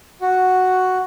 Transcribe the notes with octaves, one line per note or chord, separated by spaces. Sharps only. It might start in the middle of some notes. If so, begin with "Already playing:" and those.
F#4